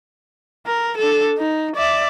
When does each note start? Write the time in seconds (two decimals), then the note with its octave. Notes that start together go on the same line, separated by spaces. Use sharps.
0.67 A#4
0.98 D4 A4
1.38 D#4
1.76 D5 E5